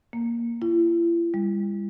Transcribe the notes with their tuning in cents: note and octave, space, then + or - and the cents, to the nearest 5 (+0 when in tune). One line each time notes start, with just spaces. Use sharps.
A#3 +5
E4 +45
G3 +40